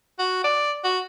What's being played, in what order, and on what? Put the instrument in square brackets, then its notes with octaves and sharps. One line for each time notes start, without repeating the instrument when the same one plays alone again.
[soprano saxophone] F#4
D5
F#4